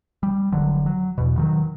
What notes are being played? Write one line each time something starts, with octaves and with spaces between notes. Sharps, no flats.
G3
F1 D3 F#3
F#3
E2 B2
D#3 F3 F#3